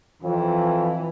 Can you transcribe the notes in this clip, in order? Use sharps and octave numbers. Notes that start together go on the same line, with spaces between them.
F2 E3